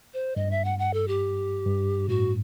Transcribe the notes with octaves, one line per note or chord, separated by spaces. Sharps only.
C5
G2 D#5
E5
F#5
F#5
A4
G4
G2
A2 F#4